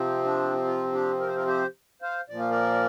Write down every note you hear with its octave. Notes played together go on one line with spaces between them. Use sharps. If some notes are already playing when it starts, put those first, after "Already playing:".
Already playing: C3 F3 C4
D4
F4
D4 G4
A#4
C5
F4 A#4
G4 C5
C5 F5
A#2 F3 A#3 D5
F5
A#4 D5